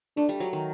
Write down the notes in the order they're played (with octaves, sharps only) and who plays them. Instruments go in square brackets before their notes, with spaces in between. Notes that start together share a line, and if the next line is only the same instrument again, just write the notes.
[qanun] A3 [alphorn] D4
[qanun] G3
F#3
D#3